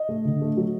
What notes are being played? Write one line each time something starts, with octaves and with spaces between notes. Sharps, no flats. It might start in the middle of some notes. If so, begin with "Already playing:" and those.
Already playing: D#5
A3
D3
A3
F#3